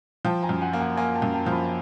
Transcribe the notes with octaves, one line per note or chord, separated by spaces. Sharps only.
F3 G5 A5
G#5 A#5
F#2
F#5 G#5
A#3
F#5 G#5
A#3 G#5 A#5
G5 A5
F#2
G5 A5
F3
A5 B5